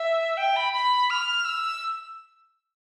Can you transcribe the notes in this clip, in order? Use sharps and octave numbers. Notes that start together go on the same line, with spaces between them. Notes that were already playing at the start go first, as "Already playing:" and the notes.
Already playing: E5
G5
B5
B5
F6
E6